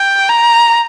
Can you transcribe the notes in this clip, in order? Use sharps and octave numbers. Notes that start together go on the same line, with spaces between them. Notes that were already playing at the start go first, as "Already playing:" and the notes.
Already playing: G5
A#5